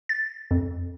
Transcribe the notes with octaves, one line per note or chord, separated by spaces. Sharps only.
A6
F2